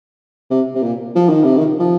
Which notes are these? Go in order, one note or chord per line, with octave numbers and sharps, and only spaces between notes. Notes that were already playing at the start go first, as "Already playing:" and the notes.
C3
C3
A#2
F3
D#3
C3
D#3
F3